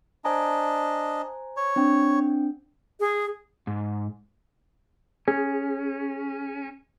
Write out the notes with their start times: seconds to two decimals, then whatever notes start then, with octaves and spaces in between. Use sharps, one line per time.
0.25 D4 C5 D#5 G#5 A#5
1.57 C#5
1.76 C4 D4 G5
3.00 G#4
3.67 G#2
5.28 C#4 G#4